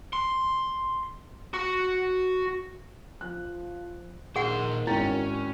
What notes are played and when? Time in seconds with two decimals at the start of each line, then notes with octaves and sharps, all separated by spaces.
0.13 C6
1.54 F#4
3.21 F3 F#6
4.36 A#2 D#3 G#4 C5 F#5
4.87 G#1 C#4 E4 F#4 G5